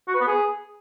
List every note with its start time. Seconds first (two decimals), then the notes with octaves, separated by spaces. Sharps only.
0.08 F#4
0.14 B4
0.21 B3
0.27 G#4